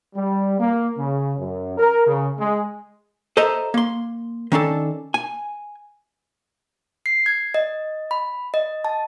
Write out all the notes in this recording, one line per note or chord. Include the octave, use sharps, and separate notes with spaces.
G3
A#3
C#3
F#2
A#4
C#3
G#3
A4 C5 D#5 E5 A#5
A#3 C6
D#3 C#4 D4 A4
G#5
C7
G#6
D#5
B5
D#5
A5